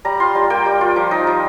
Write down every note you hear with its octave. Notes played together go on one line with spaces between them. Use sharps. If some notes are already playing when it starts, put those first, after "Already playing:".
G3 A#5
F4 C6
G3 G5
A#3 G5
G3
F4
F3
D#4
F3